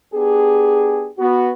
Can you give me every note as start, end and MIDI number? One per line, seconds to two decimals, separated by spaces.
0.14 1.09 59
0.14 1.09 62
0.14 1.09 67
0.14 1.09 68
1.19 1.52 59
1.19 1.52 66